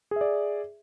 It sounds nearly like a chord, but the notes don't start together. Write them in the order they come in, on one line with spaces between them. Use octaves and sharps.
G#4 E5 D5